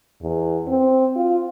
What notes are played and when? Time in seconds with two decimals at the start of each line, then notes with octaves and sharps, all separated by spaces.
0.22 E2
0.67 C4
1.16 F4